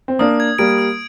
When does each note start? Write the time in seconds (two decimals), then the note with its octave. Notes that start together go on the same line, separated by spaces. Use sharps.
0.08 C4
0.19 A#3 D4 D#6
0.40 G#6
0.58 G3 A#3 D7
0.79 D#6